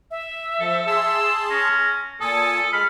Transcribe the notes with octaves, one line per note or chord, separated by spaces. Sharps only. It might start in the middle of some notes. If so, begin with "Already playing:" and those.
E5
F3 A4
G#4 A5 C6 E6
C#4 A#6
A#2 A4 G#5 A5 D#6
G#3 B5 F6